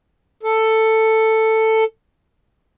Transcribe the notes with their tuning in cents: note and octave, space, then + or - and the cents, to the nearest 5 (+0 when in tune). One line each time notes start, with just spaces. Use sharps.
A4 +10